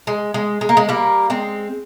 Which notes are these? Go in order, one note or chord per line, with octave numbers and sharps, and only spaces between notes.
G#3
G#3
G#3
A#3
G#3
G3 A#3
G#3 C4